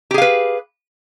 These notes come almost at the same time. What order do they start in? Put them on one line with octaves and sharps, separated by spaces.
G4 G#4 F5 B4